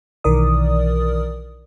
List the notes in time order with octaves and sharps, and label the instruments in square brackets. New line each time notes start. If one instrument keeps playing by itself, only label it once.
[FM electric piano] B1 D#3 E3 A#4 D5 D#6